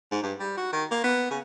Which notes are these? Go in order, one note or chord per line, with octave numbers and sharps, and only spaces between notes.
G#2
G2
G3
F#4
D#3
A#3
B3
C#3